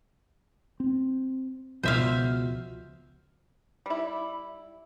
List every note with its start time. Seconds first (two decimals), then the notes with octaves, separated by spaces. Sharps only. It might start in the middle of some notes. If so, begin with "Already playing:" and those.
0.80 C4
1.83 C#2 B2 F3 C5 E5 F5
3.86 G3 E4